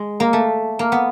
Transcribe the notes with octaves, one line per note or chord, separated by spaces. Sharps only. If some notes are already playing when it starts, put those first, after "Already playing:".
Already playing: G#3
A#3
A3
A#3
B3